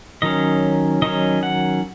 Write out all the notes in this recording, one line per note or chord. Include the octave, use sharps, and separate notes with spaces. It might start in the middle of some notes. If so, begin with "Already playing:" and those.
D#3 F#3 C#4 D#5
D#3 F#3 C#4 D#5
F#5